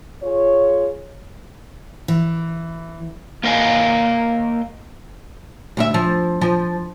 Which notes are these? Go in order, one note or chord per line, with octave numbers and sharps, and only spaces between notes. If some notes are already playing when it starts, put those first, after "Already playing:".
F4 G#4 C#5
E3
A#3 A#4 D#5 F5 G#5
D2 F4 E5
F3
F3